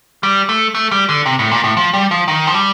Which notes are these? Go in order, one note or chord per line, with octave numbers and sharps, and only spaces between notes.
G3
A3
A3
G3
D3
C3
A2
A#2
A2
F3
G3
F3
D#3
F3
G3